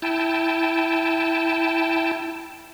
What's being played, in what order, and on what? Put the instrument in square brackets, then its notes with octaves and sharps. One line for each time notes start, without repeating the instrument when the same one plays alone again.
[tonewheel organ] E4 G5 A5